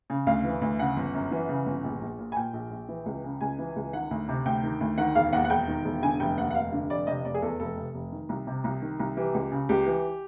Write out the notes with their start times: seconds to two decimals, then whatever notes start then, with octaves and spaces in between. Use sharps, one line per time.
0.10 C#3
0.27 D2 F5
0.44 E3
0.62 D2
0.79 C#3 F#5
0.97 G1
1.14 F#2
1.31 E3
1.49 C#3
1.66 G1
1.84 A#1
2.01 A#1
2.19 A#2
2.32 G#5
2.36 A#2 G5
2.54 A#1
2.71 A#1
2.89 E3
3.06 C#2
3.24 C#3
3.41 C#2 G#5
3.59 E3
3.76 C#2
3.93 D#3 F#5
4.11 D2
4.28 C3
4.46 D2 G5
4.63 D#3
4.81 D2
4.98 D#3 F#5
5.15 E1 F5
5.33 D#2 F#5
5.45 F#5
5.50 E1 G5
5.68 D#3
5.85 E1
6.03 D3 G#5
6.20 F1 G5
6.37 D#2 F#5
6.51 F#5
6.55 F1 F5
6.72 D3
6.90 F1 D5
7.07 C3 D#5
7.25 F1 D5
7.35 G#4
7.42 E2 A4
7.60 F1 A4
7.77 C3
7.95 F1
8.12 D#3
8.29 C2
8.47 C3
8.64 C2
8.82 D#3
9.00 C2
9.17 E3 G4
9.34 C#2
9.52 C#3
9.69 C#2 G4
9.86 E3